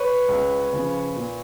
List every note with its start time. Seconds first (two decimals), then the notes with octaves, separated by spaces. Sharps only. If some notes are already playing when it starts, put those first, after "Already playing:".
Already playing: B4 C#5
0.29 C#2
0.73 C#3 F3
1.16 A#2